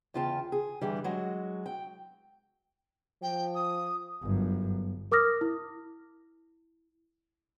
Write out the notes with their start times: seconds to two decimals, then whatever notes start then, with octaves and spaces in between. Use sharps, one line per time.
0.14 E2 C#3 F4 G5 A5
0.52 G#4
0.81 G2 D3 E3 G3
1.04 F#3 G#3 F#4
1.66 G5
3.22 F3 G5
3.54 D#6
4.23 G1 F#2
5.12 A#4 D6 D#6 F6 A#6
5.41 E4